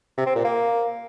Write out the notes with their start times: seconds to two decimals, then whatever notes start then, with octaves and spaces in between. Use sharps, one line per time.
0.18 C3
0.26 C4
0.35 A#2
0.44 A#3